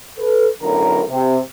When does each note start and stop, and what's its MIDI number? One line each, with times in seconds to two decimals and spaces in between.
0.19 0.47 69
0.19 0.47 71
0.62 1.02 35
0.62 1.02 42
0.62 1.02 45
0.62 1.02 50
0.62 1.02 70
0.62 1.02 82
1.09 1.38 48